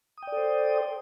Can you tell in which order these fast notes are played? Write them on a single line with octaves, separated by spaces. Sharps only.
D#6 G5 D5 A4 C5